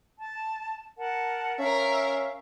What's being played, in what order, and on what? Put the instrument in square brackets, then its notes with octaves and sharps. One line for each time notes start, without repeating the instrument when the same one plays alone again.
[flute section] A5
A#4 F#5 A5
[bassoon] C#4 [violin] A#4 E5 [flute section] F5